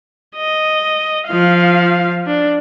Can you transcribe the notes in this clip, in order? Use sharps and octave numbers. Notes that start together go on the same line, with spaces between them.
D#5
F3 F5
D4